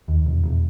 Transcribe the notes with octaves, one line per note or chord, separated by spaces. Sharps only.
D#2
E1
E1